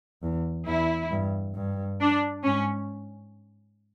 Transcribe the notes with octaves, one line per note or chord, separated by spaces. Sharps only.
E2
E2 E4
G2
G2
D4
G#2 C#4